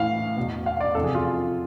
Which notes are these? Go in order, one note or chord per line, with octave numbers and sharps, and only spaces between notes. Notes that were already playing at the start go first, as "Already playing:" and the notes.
Already playing: A2 E3 F5
E2 B2
F5
D5
F2 C3 E3 A4
G#4
F4